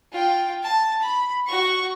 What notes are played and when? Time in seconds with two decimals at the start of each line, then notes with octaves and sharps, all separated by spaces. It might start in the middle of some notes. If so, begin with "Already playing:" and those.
0.13 F4 G5
0.63 A5
1.02 B5
1.47 F#4 C#6